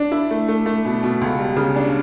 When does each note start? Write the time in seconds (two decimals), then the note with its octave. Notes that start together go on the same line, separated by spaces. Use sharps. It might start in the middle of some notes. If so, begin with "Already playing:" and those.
Already playing: D4
0.12 E4
0.31 A3
0.48 A3
0.66 A3
0.85 B2
1.03 B2
1.21 C#2
1.39 G3
1.56 C#3
1.76 D4